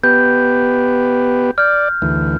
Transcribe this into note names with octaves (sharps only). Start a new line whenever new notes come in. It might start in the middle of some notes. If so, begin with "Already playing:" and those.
B3 G4 B4 G6
D5 F6 G6
D2 E3